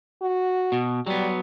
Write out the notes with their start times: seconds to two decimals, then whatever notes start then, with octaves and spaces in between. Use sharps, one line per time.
0.22 F#4
0.72 B2
1.07 F#3 G3 B3